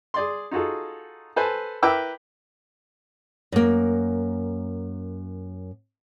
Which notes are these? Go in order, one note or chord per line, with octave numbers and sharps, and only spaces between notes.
G#4 D5 C6
D#4 F4 F#4 G#4 A4
A4 B4 C5 G#5 A5
E4 A#4 B4 G5 D6 E6
F#2 A#3